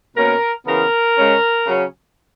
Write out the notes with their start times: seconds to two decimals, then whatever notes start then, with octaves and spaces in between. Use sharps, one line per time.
0.15 B2 A#3 C#4 A#4
0.65 C#3 E3 B3 A#4
1.16 C#3 G#3 C#4
1.66 C#3 F#3 C#4